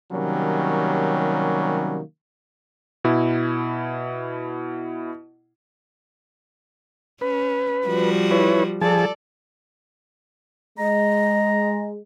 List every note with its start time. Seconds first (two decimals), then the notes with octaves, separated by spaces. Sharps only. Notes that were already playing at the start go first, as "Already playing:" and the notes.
0.11 C3 D#3 F#3 G3 A#3 C#4
3.04 B2 E4
7.21 C#4 B4
7.87 F3 G3 F#4
8.31 E4 B4 C#5
8.81 F3 G#4 A4 D5 A5
10.78 G#3 D#5 A#5